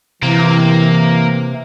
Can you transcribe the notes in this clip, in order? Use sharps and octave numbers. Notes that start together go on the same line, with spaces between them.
C3 E3 A#3